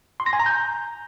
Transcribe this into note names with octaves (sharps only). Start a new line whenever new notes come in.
C6
A#6
G#5
A#5
G6